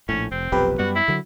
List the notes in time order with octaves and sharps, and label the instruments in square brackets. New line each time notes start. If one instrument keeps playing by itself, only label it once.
[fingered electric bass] A#1 A2 [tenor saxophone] C#4
[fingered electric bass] F1 [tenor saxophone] C4
[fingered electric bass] F1 B1 F2 [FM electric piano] G4 B4
[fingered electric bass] F#2 G3 B3 [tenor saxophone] F#4
[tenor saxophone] E4
[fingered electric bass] D3 F#3